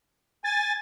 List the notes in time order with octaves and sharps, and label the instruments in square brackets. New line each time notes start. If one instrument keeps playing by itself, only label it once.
[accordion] G#5 [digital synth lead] A6